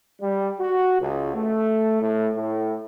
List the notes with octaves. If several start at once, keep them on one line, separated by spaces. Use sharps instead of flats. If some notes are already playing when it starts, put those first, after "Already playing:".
G3
F#4
C#2
A3
A2
A2